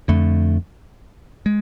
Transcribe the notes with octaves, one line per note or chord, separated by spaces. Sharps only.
F2 D3 A3
G#3